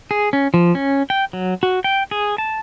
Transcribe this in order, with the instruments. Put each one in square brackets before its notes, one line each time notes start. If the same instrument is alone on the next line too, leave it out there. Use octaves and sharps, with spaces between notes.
[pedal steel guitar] G#4
C#4
F3
C#4
G5
F#3
F#4
G5
G#4
A5